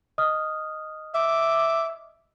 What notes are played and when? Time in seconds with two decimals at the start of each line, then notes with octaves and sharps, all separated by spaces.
0.18 D#5 D#6 F6
1.14 E5 D6